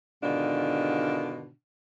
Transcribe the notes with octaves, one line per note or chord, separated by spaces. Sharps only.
G#2 B2 D3 D#3 D4 F4